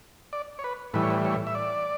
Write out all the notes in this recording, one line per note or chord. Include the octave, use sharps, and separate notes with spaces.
D5
C#5
B4
A2 E3 G3 B4
C#5
B4
C#5
E5
D5